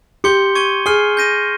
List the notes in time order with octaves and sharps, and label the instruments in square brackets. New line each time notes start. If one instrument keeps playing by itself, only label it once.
[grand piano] G4 [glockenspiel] C6 G6 C#7 G7
[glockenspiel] C#6 G#6 D#7 G7
[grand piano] G#4 [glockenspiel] F6 C7 D#7 G7
[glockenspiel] G6 A#6 D#7